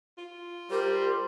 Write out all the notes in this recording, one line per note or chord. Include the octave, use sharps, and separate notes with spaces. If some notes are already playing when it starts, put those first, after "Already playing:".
F4
G3 A#4 C5